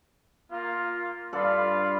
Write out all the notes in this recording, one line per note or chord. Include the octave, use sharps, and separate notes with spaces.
A#3 F4
G2 F4 A4 D5 F5 B5